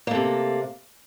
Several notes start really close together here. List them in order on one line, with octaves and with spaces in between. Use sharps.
A#3 A3 C3